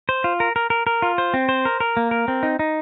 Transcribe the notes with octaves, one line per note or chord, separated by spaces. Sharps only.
C5
F4
A#4
A#4
A#4
A#4
F4
C5
C4
C5
A#4
A#4
A#3
A#4
C4
D#4
D#4